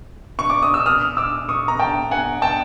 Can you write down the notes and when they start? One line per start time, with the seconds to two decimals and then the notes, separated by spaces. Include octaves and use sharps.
0.39 C#6
0.50 D6
0.63 D#6
0.74 E6
0.86 D#6 F6
1.17 D6 E6
1.49 C#6 D#6
1.68 A#5
1.80 G5 A5
2.11 F#5 G#5
2.42 G5 A5